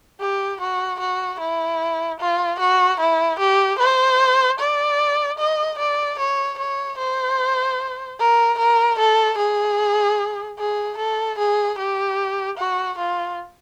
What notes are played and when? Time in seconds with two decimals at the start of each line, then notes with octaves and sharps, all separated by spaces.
0.21 G4
0.61 F#4
1.00 F#4
1.40 E4
2.20 F4
2.60 F#4
3.00 E4
3.40 G4
3.79 C5
4.60 D5
5.39 D#5
5.79 D5
6.19 C#5
6.58 C#5
6.98 C5
8.19 A#4
8.59 A#4
8.99 A4
9.38 G#4
10.59 G#4
10.98 A4
11.38 G#4
11.78 G4
12.58 F#4
12.98 F4